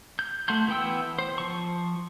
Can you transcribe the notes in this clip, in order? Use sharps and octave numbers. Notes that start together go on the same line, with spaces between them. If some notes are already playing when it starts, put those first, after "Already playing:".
G6
A3 F#4 C6 G6
E3 B3 G5 E6
C5
F3 C#6